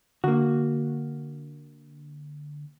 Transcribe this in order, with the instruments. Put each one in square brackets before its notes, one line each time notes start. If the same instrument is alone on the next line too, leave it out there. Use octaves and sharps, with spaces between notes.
[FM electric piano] D3 [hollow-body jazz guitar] A#3 F#4